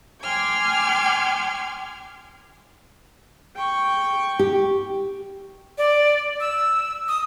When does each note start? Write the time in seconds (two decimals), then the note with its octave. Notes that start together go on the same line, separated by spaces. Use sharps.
0.22 G5 G#5 C6 D6 F6 G#6
3.56 G5 C#6
4.39 G4
5.78 D5
6.40 E6
7.08 D#6